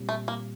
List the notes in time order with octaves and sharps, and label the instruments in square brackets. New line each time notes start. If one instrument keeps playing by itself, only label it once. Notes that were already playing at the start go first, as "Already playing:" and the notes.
Already playing: [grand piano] A#2 G3 C4
[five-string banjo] A3
A#3